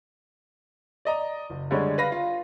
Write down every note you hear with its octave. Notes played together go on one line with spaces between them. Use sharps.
D5 D#5 A#5
F#1
D3 G3 G#3 C#5
B4 F5 B5 A#6
F4